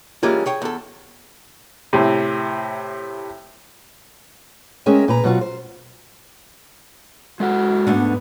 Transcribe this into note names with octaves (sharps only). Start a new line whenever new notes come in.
E3 G3 G#3 A#3 C#4 F4
G#4 C#5 G5
E2 A4
A2 C3
G#3 C4 C#4 G#4 A#4 E5
A#2 B4 A#5
B2 F#3 C4 F4 F#4
C5
G#3 F#4 A4 F#5
D2 G#2 D3 B3